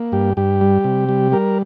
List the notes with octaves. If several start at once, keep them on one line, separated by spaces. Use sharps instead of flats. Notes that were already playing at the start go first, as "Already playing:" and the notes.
Already playing: A#3
G2 G4
G2 G4
G3
C3
G3
G3 A#4